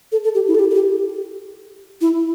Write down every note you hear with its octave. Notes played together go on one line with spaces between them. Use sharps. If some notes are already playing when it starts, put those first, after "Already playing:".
A4
A4
G4
E4
A4
G4
A4
G4
E4